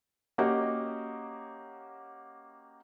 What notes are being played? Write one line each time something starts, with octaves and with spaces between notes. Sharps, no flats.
A#3 C#4 F#4 G4 D#5